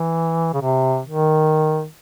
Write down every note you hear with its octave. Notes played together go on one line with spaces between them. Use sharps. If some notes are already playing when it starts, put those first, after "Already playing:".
Already playing: E3
C#3
C3
D#3